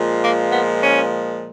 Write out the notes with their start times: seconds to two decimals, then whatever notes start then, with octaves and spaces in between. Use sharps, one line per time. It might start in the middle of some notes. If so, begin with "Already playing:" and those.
Already playing: A#2 F3 G#3
0.21 A#3
0.51 B3
0.81 C#4